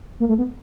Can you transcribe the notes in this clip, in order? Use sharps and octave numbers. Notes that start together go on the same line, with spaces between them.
A#3
A3
B3